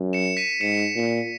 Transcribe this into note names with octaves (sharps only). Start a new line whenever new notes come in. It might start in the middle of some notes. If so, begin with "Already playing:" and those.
Already playing: F#2
C#7 E7
B6 D#7
G#2 C#7 E7
A#2